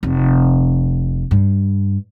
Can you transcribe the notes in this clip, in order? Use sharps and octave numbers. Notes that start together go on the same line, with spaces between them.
F1
G2